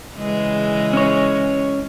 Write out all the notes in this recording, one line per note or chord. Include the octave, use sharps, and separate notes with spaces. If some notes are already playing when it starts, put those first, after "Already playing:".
C#3 E3 G#3
C#4 C#5